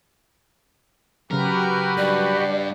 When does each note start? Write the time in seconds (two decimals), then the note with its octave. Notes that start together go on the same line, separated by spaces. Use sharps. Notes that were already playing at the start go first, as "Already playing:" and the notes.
1.31 C#3 F#3 F#4 G4 A#4 B4
1.97 G2 D5